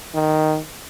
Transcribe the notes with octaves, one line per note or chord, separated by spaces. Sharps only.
D#3